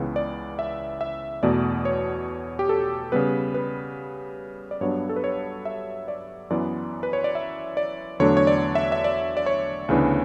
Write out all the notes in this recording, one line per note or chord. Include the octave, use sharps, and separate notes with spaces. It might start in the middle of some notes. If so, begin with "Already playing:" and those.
Already playing: C#2 C#3 E3 B3
D5
E5
E5
E2 B2 A3 D5
C#5
G4
A4
C#3 G3 B3 B4
B4
D5
G2 F#3 B3 D4 C#5
A4
B4
C#5
E5
D5
F#2 E3 B3 D5
B4
C#5
D5
E5
D5
E2 D3 F#3 A3 D4 C#5
C#5
D5
E5
E5
D5
D5
C#5
D2 C#3 E3 B3 D4